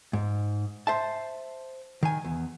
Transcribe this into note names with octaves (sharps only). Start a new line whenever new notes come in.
G#2
C5 E5 A5
D#3 G#5
E2